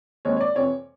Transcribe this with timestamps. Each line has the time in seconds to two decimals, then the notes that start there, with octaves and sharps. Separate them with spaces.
0.25 D#2 D#3 G#3 C4 C#5
0.37 C#5
0.41 D5
0.55 F2 C3 E3 C#5